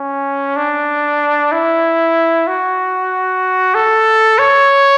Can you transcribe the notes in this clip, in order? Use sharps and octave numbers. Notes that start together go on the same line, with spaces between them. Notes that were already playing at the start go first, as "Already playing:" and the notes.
Already playing: C#4
D4
E4
F#4
A4
C#5